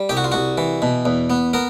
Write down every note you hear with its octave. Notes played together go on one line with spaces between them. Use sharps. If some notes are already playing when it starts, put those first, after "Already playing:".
Already playing: G3
C2 G4
F#4
F4
C2 F#4
E3
B2
E2
B3
B3 A#4